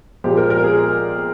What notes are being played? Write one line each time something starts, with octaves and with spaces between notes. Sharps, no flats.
A#2 F3 G#3 G4
A#4
A#4
G#4